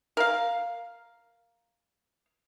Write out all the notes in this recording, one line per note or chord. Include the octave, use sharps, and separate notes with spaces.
A#4 F5